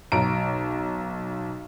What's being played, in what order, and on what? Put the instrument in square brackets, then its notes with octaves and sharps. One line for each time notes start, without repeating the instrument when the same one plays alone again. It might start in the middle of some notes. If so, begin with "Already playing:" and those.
[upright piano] B1 A#5 D7